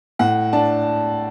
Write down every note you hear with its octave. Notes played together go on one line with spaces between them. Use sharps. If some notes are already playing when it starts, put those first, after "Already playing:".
A2 F#5
D4 A5